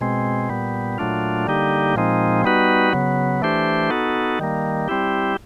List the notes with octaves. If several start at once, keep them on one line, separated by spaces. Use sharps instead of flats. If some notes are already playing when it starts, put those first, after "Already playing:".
B2 G#3 C4
A#2 G3 B3
A#2 F#3 A3 D4 F4
D3 G3 A#3 D#4 G4
A#2 F3 G#3 C4 D#4
G3 B3 D#4 F#4 B4
C#3 F#3 B3
E3 A3 D4 G4 C5
B3 D#4 F#4 A4
D#3 G3 A#3
G3 C4 E4 G4